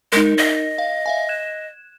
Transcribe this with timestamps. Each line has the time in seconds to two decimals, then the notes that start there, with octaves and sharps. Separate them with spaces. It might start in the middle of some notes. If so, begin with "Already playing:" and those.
0.13 G#3 D#4 A#4
0.38 D#5
0.78 F5
1.06 E5 F5 G#5
1.29 F#6 G#6 E7